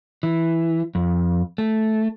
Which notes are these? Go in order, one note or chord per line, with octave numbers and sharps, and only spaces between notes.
E3
F2
A3